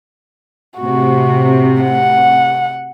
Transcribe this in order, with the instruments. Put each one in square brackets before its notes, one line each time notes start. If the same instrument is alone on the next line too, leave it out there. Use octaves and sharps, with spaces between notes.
[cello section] A2 C3 [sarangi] F#4
[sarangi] F#5